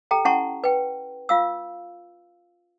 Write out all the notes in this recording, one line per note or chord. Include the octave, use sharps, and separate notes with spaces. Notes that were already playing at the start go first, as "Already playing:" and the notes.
G4 A4 G5 A#5
C#4 E4 F#5 A5 A#5 C#6
B4 G5
F4 F5 E6